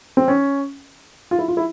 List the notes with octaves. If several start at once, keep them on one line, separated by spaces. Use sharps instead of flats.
C4
C#4
F4
E4
F4
E4